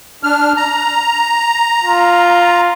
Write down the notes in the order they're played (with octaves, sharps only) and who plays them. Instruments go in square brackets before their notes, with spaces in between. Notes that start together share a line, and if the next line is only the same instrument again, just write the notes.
[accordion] D4 F6
A#5
[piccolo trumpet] F4